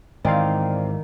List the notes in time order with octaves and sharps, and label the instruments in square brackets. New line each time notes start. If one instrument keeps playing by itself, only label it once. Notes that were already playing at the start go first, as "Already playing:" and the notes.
[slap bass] G#2 E3 [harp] D#3 [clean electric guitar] C4 [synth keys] D5 F5